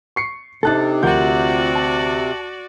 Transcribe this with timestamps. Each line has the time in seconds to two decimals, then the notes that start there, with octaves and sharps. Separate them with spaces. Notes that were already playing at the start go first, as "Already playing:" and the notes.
0.16 C#6 C7 C#7
0.63 C3 D4 D#4 A4 A5 F#6 A6
1.03 D2 F4 F#4 A#4 D5 F#5 G6
1.75 A5